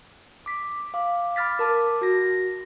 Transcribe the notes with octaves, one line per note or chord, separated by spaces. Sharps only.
D6 B6
F5 D6
B5 D6 F6 A6 B6
A#4 A5 D6
F#4 A#6